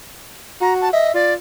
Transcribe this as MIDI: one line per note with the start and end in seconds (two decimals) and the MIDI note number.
0.61 0.90 66
0.61 0.74 82
0.81 0.89 81
0.93 1.14 75
0.93 1.09 76
1.14 1.36 65
1.14 1.33 74